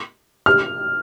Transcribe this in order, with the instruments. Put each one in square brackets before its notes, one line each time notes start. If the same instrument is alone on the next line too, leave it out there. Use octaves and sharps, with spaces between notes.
[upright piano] F6